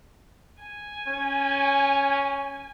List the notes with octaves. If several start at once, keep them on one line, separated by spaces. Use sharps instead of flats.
G#5
C#4